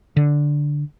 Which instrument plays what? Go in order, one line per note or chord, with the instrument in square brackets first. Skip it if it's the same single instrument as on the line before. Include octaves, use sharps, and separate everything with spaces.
[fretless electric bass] D3